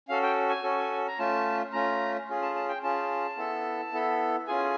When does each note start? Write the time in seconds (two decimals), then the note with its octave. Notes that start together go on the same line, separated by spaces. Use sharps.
0.09 C#4 F#4 A4 F5
0.23 G5
0.49 G#5
0.63 C#4 F#4 A4
1.08 A#5
1.19 A3 C#4 F4 A5
1.73 A3 C#4 F4 A#5
2.28 C#4 F4 G#4
2.42 A5
2.55 A5
2.69 G5
2.83 C#4 F4 G#4 A5
3.37 B3 E4 A4
3.93 B3 E4 A4
4.47 C#4 F4 G#4 G#5